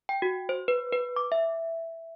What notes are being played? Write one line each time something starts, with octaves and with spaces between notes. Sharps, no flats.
G5
F#4
C5
B4
B4
D6
E5